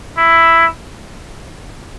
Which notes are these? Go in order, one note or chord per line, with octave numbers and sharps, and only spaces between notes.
E4